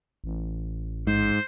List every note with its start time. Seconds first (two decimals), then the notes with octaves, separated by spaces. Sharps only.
0.24 A1
1.07 G#2 C5